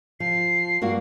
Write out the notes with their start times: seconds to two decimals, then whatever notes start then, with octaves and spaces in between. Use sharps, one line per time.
0.20 F3 C7
0.82 G2 A#3 F#4